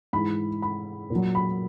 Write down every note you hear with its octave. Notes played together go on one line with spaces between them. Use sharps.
G#2 E3 B5
B5
A#2
F#3
B5